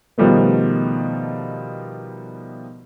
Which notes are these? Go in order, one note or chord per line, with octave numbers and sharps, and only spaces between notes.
B2 D#3 F3 G3 A3 B3